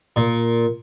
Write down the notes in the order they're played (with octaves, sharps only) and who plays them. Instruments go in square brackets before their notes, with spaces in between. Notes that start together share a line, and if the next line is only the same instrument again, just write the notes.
[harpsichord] A#2